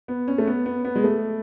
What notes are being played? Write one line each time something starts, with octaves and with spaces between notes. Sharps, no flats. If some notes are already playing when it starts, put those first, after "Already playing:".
B3
C#4
A3
B3
B3
B3
G#3
A3